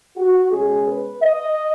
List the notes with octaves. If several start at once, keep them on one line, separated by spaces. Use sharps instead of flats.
F#4
B2 G#3 C#4 G#4
B4
D#5